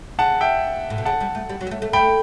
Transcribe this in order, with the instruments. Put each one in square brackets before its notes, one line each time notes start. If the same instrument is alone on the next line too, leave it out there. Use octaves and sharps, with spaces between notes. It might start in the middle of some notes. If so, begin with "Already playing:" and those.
[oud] C#3 [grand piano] F#5 A5
[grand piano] E5 G5
[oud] A2
B2
[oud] C#3 [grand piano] F#5 A5
[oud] G3
A3
G3
F#3
G3
A3
A3
[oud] A3 [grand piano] G5 B5